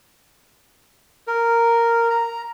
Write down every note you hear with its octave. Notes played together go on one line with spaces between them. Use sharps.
A#4
A#5